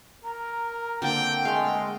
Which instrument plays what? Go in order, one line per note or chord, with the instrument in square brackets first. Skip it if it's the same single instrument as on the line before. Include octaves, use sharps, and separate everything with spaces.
[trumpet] A#4 [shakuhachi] A#5
[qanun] D3 A#3 C4 [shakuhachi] F#5 [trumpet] G5
[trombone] G#3 [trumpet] A3 [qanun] F5 C6